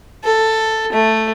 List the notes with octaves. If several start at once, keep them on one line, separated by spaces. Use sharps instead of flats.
A4
A3